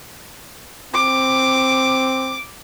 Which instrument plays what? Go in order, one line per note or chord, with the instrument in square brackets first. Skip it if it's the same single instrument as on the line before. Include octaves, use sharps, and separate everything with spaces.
[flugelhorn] C4 [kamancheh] D6